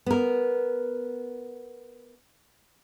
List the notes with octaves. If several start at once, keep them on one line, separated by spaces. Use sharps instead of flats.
B3 A#4